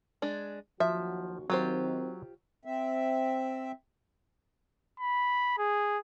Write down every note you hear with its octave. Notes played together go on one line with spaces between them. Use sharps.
G#3 D4
D#2 F3 F#3 F#4 E5
D#3 F#3 C4 F4 G4 C5
C4 E5
B5
G#4